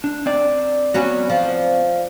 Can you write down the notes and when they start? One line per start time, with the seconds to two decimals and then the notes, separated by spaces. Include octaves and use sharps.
0.04 D4
0.26 C4 D5
0.94 F#3 B3 C#4
1.30 F3